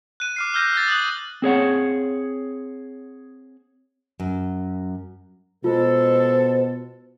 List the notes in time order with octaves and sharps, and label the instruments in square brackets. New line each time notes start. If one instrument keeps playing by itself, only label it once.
[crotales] F#6 D#7
D6 F6 C7
E6 F6 G6 A#6 D#7
E6 G6 A6
D#6 F#6 F#7
[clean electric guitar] C4 G#4 C#5 F#5
[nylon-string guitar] F#2
[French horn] B2 [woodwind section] G#3 A4 [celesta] F4 [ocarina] C5